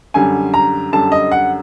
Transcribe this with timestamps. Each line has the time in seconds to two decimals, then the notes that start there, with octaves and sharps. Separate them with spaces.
0.14 F#2 D3 G3 G#5
0.54 A#5
0.92 F#2 D3 G3 A5
1.12 D#5
1.32 F#5